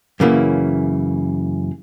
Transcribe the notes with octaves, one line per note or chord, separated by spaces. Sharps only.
F#2 C#3 E3 A#3 E4